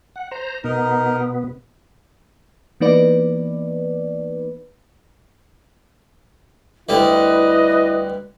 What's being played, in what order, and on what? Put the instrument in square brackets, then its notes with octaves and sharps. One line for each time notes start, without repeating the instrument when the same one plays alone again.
[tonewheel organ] F#5
C5 A#5
[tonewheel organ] B2 B3 [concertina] D#4 A#4
[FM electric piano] E3 A#3 B3 D#4 B4 D5
[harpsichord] D2 G3 [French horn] E4 [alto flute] B4 [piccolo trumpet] D#5